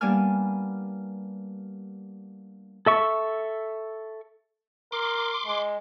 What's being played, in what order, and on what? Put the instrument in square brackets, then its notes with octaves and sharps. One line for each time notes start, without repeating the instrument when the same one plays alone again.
[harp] G3 A#3 B3 D4 G#5 F6
[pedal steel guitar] A4 E5 C#6
[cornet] A#4 [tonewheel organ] C6 D6
[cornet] G#3